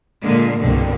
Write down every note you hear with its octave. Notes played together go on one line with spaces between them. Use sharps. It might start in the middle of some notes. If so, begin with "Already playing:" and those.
A#2 D3 G#3 A#3
C2 G2 B2 D3 A#3